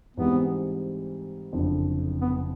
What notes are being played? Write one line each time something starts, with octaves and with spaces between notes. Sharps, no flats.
G#2 E3 G3 B3 C4
F#1 F2 D3
B3